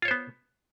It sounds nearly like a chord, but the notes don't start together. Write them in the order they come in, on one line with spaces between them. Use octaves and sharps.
F4 C#5 C5 B3